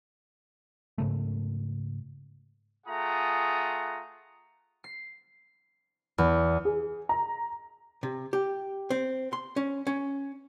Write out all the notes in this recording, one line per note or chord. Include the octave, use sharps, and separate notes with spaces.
G#2 C#3 A3
A3 F4 G#4 F#5 A#5 D#6
C7
E2
G#4
A#5
C3
G4
C4
C6
C#4
C#4